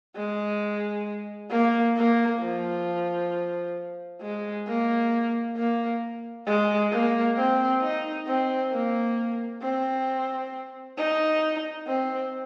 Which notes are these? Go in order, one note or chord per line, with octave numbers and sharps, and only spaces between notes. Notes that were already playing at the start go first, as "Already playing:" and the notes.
G#3
A#3
A#3
F3
G#3
A#3
A#3
G#3
A#3
C4
D#4
C4
A#3
C4
D#4
C4